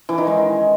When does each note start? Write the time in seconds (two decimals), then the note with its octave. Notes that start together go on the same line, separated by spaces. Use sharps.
0.09 E3
0.18 D#3
0.27 G#3